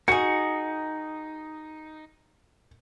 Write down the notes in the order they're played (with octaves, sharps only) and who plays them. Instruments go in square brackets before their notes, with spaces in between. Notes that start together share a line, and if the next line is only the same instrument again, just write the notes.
[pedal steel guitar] D#4 [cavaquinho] F#4 G#4 [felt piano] C#7